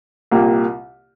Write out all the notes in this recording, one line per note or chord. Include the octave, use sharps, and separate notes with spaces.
C2 A#2 A#3 G4